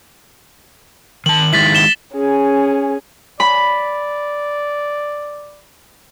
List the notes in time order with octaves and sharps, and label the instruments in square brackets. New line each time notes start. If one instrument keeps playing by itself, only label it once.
[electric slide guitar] D#3 A5 [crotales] F#7
[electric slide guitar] D#3 G#3 E4 [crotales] A6 B6 F#7
[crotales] E7 G7
[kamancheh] C#4 G#4
[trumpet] D5 [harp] B5